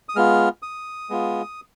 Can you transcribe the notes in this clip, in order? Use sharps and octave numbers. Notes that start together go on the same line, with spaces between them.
D#6
G#3 B3 F4 F6
D#6
G#3 B3 F4